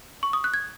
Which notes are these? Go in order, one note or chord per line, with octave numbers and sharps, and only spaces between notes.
C#6
D#6
F#6
G#6